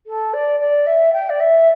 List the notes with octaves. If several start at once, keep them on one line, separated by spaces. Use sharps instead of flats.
A4
D5
D5
E5
G5
D5
E5